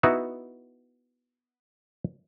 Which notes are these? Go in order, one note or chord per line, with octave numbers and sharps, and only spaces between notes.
B3 D#4 E4 F#4 E5